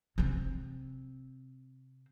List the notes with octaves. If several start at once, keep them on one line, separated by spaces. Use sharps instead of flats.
C3 C4